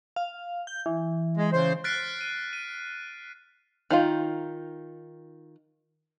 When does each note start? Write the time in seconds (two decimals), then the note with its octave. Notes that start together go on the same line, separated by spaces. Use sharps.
0.16 F5
0.67 G6
0.86 E3
1.37 G#3
1.53 C#3 C5
1.84 F6 F#6 A6 B6 C7 D7
2.21 D#7
2.53 D#7
3.90 D#3 D#4 F4